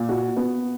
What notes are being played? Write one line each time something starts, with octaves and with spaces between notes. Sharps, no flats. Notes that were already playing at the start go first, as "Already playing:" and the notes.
Already playing: A#2
F#4
B3